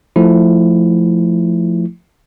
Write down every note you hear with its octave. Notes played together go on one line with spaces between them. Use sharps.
F3 A3 E4